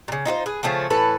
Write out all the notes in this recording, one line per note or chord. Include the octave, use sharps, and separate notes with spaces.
A#2 C#3
D#4 F4 G4 C5
G#4 B4
C#3 F3 A3 C4
A2 E3 A4 B4